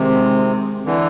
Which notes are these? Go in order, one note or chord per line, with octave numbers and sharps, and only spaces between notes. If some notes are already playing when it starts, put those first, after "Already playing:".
Already playing: C3 D#3 G#3 C4
D3 E3